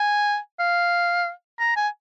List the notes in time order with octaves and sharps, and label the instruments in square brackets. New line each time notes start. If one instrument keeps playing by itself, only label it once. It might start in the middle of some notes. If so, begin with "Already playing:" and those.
Already playing: [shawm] G#5
F5
A#5
G#5